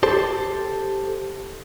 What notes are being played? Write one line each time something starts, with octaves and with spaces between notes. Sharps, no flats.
G4 A4 C5